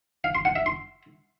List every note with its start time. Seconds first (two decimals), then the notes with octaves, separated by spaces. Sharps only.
0.24 F5
0.35 C6
0.45 F#5
0.56 E5
0.66 C6